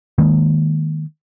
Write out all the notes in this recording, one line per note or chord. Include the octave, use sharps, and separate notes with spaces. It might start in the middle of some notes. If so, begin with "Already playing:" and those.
D#3 G#3 A#3